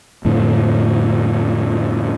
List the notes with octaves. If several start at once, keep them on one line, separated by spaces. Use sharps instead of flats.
F2 A2 D3